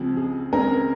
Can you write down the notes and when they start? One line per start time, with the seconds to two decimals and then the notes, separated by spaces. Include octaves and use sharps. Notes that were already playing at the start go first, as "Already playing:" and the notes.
Already playing: C#2 C#3 F3 C4
0.17 G#4
0.52 C#2 C#3 G#3 C4 A#4